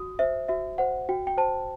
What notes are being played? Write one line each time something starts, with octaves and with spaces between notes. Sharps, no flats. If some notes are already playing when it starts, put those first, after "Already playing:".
Already playing: F#4 D#6
C5 E5
F#4 E5
C5 F#5
F#4 G5
G5
C5 A5